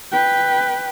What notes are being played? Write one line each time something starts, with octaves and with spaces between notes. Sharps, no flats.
B4 G5